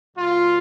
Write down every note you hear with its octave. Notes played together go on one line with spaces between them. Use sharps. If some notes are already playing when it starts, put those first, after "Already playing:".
A#2 F#3 F4